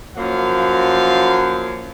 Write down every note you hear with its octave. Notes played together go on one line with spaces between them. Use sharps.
F#2 F3 F#3 A#3 F5